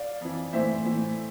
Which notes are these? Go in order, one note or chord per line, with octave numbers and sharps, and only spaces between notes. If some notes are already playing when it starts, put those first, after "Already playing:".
Already playing: D5 F5
F2 E3
A2 E3 C5 E5
A2 E3